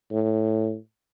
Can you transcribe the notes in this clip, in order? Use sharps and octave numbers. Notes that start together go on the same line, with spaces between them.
A2